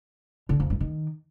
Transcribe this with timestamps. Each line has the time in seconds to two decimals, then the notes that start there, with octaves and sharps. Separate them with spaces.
0.49 D3
0.60 F2
0.70 G2
0.80 D#3